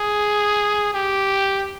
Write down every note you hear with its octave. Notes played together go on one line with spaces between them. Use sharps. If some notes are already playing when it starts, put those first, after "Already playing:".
Already playing: G#4
G4